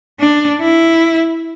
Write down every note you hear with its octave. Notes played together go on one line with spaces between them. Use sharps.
D4
E4